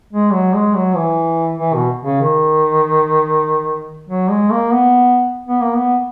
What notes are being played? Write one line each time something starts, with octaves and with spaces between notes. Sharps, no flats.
G#3
F#3
G#3
F#3
E3
E3
B2
C#3
D#3
F#3
G#3
A#3
B3
B3
A#3
B3